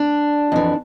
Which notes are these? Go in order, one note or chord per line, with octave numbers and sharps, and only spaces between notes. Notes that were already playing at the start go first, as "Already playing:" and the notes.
Already playing: D4
F2 E3